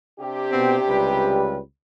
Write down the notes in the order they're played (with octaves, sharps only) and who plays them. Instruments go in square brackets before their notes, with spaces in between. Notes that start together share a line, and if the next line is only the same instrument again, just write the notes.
[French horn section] C3 D4 G4
[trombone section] B2 B3 C4
C#2 G3 B4